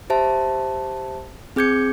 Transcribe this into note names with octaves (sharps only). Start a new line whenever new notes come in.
G4 C5 E5 A5
C4 G#4 D6 G6 G#6 C#7